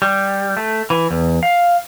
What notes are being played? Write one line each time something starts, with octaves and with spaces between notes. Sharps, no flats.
G3
A3
E3
E2
F5